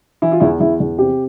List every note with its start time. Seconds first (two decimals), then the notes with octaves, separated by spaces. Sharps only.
0.22 E3 E4
0.32 F4
0.40 E2 E4
0.60 E2 E4
0.80 E2
0.98 C3 G4